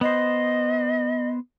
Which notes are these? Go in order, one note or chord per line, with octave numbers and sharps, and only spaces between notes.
B3 C5 D#5